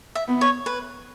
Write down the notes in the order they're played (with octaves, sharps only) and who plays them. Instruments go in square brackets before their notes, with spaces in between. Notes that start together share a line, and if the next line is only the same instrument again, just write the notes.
[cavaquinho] E5
[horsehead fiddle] B3
[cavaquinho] C#5
B4